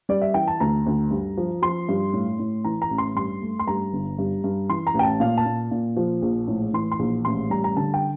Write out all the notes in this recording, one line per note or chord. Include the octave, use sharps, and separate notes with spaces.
G3 D5
E5
E3 G5
A5
D2 A#5
D2
G2
F3
F3 C6
G2
A2
A2
E3 A#5
A#5
A1
C6
G2 C6
A3
C6
G2 A#5
G1
G2
G2
E3 C6
A#5
A1
G5
A5
A#2 F5
A5
A#2
A#2
F3
A#1
A2
E3 C6
C6
A#1
A1 C6
G3 A#5
A#5
D3 A5
G5